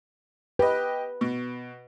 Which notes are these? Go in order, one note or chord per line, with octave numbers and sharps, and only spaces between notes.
G4 B4 D#5
B2